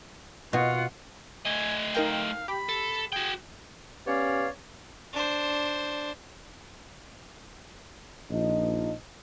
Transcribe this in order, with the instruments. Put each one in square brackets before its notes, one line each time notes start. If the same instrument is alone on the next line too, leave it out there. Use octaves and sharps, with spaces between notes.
[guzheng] B2 F#4 [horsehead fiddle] F4 F#5
[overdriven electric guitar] A3 D#5 [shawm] G#5
[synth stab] D#4 A#4 G5 [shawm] F5
[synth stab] G4 [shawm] B5
[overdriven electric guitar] A4
[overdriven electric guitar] F#4 G5 [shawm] G#4
[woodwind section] B3 C#4 G4 C#5 D5 F5
[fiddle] D4 C5
[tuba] A#1 [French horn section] F3 D#4 D#5